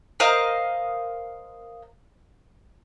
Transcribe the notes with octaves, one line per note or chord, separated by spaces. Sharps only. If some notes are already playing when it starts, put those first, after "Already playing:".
A#4 C5 D#5 F5